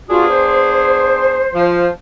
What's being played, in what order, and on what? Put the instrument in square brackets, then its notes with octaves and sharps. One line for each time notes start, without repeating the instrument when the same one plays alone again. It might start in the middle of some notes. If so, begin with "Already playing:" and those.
[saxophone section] B3 D4 G#4 [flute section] F4 F#4
[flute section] C5
[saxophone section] F3